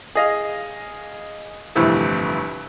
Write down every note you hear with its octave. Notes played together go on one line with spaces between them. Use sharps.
G#4 D#5 F5
G1 F2 A2 C3 E3